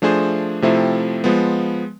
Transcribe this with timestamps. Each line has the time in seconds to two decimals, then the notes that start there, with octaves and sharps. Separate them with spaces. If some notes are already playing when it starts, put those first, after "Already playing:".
0.02 F3 A3 D4 G#4 C5
0.62 C3 F3 A3 C4 E4
1.24 F3 G#3 B3